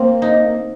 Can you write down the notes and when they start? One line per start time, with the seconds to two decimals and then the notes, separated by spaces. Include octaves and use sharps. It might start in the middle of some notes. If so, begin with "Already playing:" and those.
Already playing: A#3 C4
0.22 D#4